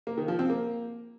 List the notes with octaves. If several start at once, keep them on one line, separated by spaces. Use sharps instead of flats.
A#3
D#3
F3
C4
A#3